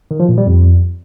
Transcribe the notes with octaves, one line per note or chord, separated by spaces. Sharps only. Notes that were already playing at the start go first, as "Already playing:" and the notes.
D#3
F3
A#2
G3
F2